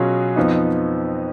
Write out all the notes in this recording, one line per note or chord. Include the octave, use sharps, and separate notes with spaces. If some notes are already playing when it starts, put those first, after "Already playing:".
Already playing: B2 F#3 C#4 F4 G#4
F2 F3 B3 D#4